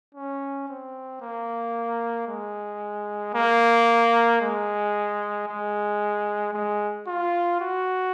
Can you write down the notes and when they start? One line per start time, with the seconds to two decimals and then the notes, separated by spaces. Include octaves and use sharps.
0.15 C#4
0.68 C4
1.21 A#3
2.28 G#3
3.34 A#3
4.41 G#3
5.48 G#3
6.54 G#3
7.07 F4
7.60 F#4